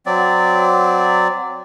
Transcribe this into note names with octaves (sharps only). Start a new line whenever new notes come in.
F#3 C4 D5